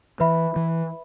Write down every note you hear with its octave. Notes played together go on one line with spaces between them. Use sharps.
E3 B4 E5 B5
E3